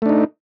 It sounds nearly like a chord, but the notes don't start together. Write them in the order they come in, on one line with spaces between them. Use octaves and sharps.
A3 D4 D#4